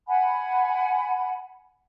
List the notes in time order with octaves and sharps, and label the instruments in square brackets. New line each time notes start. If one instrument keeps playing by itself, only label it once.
[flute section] F#5 G#5 B5